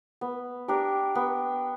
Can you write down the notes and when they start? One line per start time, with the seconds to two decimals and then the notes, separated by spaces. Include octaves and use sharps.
0.21 B3
0.68 D4 G4 A#4
1.15 B3